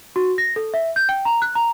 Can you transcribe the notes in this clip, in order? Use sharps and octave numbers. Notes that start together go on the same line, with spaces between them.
F#4
A#6
A4
E5
G6
G5
A#5
F#6
A#5